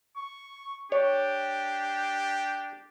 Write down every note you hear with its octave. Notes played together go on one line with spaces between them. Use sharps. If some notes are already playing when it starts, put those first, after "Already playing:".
C#6
D4 G4 C#5